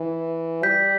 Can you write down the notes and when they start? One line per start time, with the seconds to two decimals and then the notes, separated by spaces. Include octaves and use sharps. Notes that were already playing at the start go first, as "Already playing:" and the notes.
Already playing: E3
0.63 G3 G6 B6